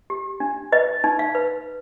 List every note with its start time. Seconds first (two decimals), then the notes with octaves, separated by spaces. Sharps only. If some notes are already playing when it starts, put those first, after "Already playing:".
0.10 G4
0.40 D4
0.72 B4 D#5
1.04 D#4
1.19 F5
1.35 B4